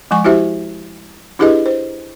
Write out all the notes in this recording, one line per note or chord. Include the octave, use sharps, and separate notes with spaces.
F3 G#3 G#5 C#6
E4 F#4 G4 C5 E5
D4 E4 G4 G#4 B4 D#5
C5